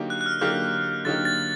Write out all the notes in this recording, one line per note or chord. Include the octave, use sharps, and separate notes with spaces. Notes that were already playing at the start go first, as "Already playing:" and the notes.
Already playing: D3 F#3 A#3 D#4 G4
F#6
F#6
F6
D3 F#3 A#3 D#4 G4 F6
D3 F#3 A#3 D#4 G4 A6
A6